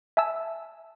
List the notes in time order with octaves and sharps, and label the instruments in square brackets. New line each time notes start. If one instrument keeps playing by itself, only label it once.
[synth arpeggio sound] E5 G#5 A5 E6